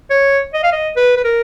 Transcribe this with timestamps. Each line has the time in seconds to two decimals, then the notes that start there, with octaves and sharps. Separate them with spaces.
0.10 C#5
0.54 D#5
0.63 F5
0.72 D#5
0.96 B4
1.16 B4
1.24 A#4